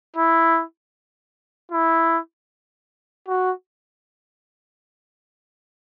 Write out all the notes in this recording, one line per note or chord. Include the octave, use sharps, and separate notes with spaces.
E4
E4
F#4